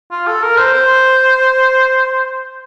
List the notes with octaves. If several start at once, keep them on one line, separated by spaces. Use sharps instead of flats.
F4
A4
A#4
C5
C5